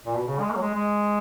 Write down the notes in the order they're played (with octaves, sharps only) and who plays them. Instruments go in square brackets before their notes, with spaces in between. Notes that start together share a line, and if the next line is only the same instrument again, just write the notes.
[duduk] A#2
B2
C#3
G#3
A#3
F#3
G#3
G#3